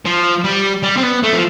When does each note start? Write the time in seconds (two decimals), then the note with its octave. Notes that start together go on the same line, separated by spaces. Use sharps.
0.05 F3
0.44 G3
0.83 G3
0.97 C4
1.03 B3
1.23 A3
1.33 F3